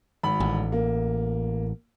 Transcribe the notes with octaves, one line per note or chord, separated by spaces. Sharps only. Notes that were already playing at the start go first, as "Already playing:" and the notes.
G#1 B5
A1
A#3